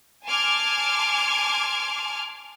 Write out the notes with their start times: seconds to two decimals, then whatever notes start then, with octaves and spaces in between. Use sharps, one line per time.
0.25 G#5 A5 C6 D6 F6 G#6